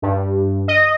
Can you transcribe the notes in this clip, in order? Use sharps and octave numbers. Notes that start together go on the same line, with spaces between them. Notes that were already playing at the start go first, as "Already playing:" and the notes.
G2
D#5